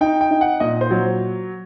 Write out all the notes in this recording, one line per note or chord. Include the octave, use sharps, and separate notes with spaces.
D#4 G5
G5
D#4
F#5
A#2 D#5
C5
F#3